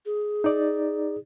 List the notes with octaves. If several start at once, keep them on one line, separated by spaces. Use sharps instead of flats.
G#4
D#4 D5